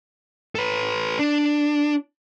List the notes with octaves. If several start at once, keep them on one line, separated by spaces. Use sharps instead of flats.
A4 B4
D4